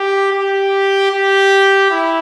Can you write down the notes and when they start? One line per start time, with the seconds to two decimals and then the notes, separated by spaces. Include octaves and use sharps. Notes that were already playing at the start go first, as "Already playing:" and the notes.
Already playing: G4
0.33 G4
1.11 G4
1.91 E4